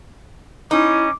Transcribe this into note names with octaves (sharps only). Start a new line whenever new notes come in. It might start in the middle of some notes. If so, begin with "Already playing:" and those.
C#4 D#4 E4 D6